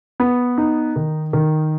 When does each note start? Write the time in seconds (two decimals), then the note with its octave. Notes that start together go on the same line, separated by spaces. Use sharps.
0.20 B3
0.58 D#4
0.96 D#3
1.33 D#3